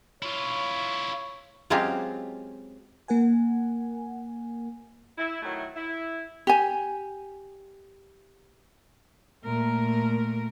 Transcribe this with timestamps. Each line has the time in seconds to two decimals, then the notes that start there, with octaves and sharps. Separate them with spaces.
0.22 E4 F4 C#5
1.70 F#3 G#3 C4 C#4 F4 G4
3.08 A#3 A#4 F#5 G#5
5.18 E4
5.43 D#3 F#3 A3 E4
5.76 E4
6.47 G4 G#5
9.45 A#2 A3 A#4